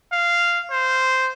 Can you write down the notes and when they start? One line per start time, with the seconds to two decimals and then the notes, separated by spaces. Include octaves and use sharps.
0.12 F5
0.70 C5